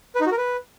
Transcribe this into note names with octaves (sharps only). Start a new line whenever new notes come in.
B4
D#4
F#4
A#4
B4